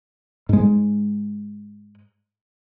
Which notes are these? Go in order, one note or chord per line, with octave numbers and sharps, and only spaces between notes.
G#2 G#3